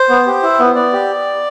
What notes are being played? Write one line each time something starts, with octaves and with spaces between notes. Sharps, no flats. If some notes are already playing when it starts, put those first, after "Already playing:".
Already playing: C5
B3
G4
E4
B3
B3 D5
G4